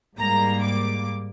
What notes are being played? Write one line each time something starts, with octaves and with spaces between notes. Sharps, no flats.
G#2 G3 A#3 A#5
D6